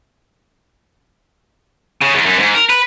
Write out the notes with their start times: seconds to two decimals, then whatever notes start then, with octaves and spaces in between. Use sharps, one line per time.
2.01 C#3
2.14 E2
2.26 F#2
2.40 G#2
2.55 A#4
2.70 B4